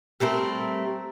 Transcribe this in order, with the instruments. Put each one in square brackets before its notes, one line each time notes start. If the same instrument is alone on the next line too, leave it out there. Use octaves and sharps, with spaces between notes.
[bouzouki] G3 A3 C4 A#4